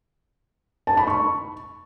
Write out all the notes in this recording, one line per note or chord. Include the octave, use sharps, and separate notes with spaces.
A5
B5
C#6